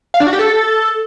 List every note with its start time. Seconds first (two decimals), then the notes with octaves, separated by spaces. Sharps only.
0.14 F5
0.20 D4
0.27 F#4
0.33 G4
0.39 A4